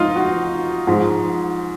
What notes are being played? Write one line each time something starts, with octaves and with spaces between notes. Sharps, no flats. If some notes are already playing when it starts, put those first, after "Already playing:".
Already playing: F3 D#4 F4
F#4
G#2 F3